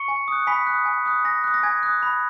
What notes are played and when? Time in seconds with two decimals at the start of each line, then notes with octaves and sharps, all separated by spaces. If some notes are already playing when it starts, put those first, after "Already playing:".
Already playing: C#6 C#7
0.08 G#5
0.28 D#6 F#6
0.47 G#5 B5 B6
0.67 D#6 F#6
0.85 G#5
1.05 D#6 F#6
1.24 G#5 A#6
1.44 D#6 F#6
1.54 A#6
1.63 G#5 G#6
1.83 D#6 F#6
2.03 B5